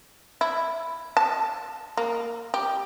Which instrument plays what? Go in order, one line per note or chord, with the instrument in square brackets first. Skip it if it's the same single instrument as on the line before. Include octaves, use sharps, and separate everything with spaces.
[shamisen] E4
A5
A#3
G4